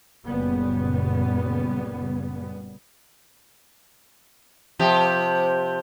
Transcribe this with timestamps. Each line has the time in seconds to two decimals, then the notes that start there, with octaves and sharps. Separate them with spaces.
0.25 F#1 F#2 A#2 C#3 G3 B3
4.79 C3 F3 G4